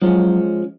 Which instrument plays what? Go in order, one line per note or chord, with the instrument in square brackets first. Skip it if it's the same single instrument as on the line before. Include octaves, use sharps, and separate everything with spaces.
[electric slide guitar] F3 G#3 C#4 [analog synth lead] F#3